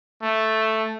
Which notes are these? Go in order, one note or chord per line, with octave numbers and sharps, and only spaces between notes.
A3